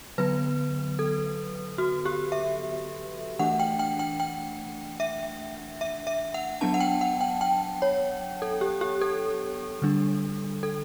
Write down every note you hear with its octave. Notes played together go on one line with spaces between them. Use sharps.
D3 F#3 B3 B4
A4
F#4
G4
E5
E3 A3 D4 F#5
G5
G5
G5
G5
E5
E5
E5
F#5
F#3 B3 D4 A5
F#5
G5
F#5
G5
G5
C#5
A4
G4
G4
A4
D3 G3 D4
A4